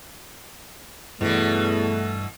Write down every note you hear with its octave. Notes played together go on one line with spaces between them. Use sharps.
E2 G2 B2 E3 A3 D5